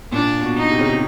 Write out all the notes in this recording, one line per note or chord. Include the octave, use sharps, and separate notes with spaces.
A#2 D4
B2
D#4
C3
C#3
C3